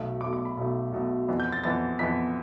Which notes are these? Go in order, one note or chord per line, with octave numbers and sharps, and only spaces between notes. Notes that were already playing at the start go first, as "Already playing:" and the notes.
Already playing: B1 B2 A3
B1 B2 A3 D6
D6
B5
B1 B2 A3
B1 B2 A3
F2 E3 B3
G6
A6
F2 E3 B3 A6
F2 E3 B3 B6